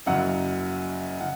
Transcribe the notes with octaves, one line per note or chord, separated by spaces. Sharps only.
F#1 F#2 C#3 F#3 F#5
C#3 F#5